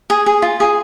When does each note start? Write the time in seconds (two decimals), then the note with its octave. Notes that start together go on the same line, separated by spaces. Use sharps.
0.10 G#4
0.26 G#4
0.42 F4
0.60 G#4